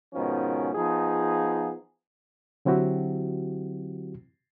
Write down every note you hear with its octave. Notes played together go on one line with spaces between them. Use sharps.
G#2 B2 D#3 F3 C#4
F3 B3 D#4 F4 G#4
D3 F#3 C4 E4 F#4 G4